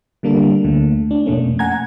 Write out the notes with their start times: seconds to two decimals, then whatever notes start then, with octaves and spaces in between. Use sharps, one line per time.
0.23 D3 G3 A#3 D4 A4
0.64 D2 D3 A3
1.11 D4
1.26 F2 B2 A3 A#3 C#4
1.59 F#5 G#5 A#5 G#6